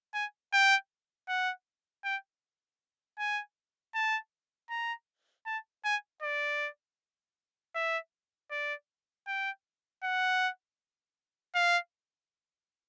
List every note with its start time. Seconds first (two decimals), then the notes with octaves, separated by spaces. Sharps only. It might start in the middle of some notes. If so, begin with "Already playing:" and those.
0.14 G#5
0.53 G5
1.28 F#5
2.04 G5
3.18 G#5
3.95 A5
4.70 A#5
5.46 A5
5.85 G#5
6.22 D5
7.75 E5
8.51 D5
9.27 G5
10.03 F#5
11.55 F5